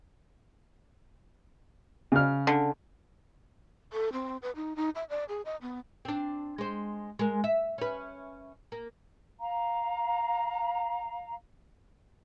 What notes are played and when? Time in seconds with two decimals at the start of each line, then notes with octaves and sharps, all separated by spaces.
2.12 C#3 F6
2.47 D3
3.93 A4
4.13 C4
4.42 B4
4.56 D#4
4.76 D#4
4.95 E5
5.10 D5
5.29 G#4
5.45 D#5
5.62 B3
6.05 C4 D4
6.58 G#3 C5
7.19 G#3 A#4
7.44 E5
7.78 C#4 B4
8.72 A#3
9.40 F5 A#5